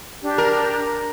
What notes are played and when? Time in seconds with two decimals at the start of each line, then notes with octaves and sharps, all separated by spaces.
0.23 D4 G4
0.38 A#4